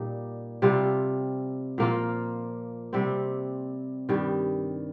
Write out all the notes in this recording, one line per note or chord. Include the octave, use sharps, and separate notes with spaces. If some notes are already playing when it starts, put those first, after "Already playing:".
Already playing: A#2 G3 D#4
C3 G3 C4 F4
A#2 F3 A#3 F4
C3 G3 C4
G2 D#3 G3